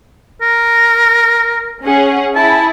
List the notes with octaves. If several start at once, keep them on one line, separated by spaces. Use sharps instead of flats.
A#4
C#4 G#4 F#5
E4 G#4 A5